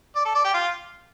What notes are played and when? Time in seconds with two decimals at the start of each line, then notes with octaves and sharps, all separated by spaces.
0.16 D5
0.25 A4
0.35 D5
0.44 G4
0.54 F4